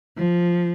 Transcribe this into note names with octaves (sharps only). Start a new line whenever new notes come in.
F3